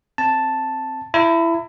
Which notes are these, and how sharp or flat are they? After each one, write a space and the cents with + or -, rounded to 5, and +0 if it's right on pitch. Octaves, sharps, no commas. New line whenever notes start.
C4 +0 A5 +0
E4 +20 A#5 -30